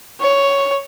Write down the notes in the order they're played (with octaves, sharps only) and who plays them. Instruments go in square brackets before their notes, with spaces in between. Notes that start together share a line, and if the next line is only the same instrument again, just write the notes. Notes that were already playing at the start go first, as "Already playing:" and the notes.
[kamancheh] C#5